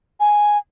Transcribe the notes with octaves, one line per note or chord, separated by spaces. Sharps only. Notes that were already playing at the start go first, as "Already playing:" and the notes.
G#5